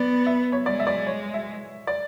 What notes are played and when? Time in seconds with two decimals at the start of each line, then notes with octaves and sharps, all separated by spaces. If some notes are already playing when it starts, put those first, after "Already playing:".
Already playing: B3 D5
0.26 E5
0.52 C#5
0.66 G#3 D5
0.80 E5
0.87 D5
1.07 C#5
1.34 E5
1.87 D5